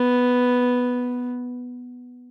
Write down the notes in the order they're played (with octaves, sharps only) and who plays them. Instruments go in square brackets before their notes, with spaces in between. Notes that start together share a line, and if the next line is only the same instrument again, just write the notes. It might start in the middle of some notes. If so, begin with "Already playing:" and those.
Already playing: [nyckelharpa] B3